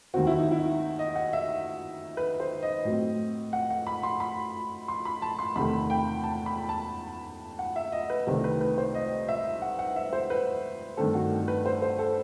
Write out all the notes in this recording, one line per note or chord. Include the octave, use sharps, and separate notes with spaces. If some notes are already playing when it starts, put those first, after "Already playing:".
D#2 D#3 F#3 C4 F#4
E4
D#4
E4
D#5
F#5
E5
B4
C5
D#5
A2 F#3 C4
F#5
F#5
B5
C6
B5
C6
B5
A5
C6
E2 C3 D#3 A3 B5
G5
A5
B5
A5
F#5
E5
D#5
B4
C2 C3 D#3 A3 C4 G4
B4
B4
C5
D#5
E5
F#5
F#5
E5
C5
B4
G2 D#3 A3 C4 A4
F#4
B4
C5
C5
A4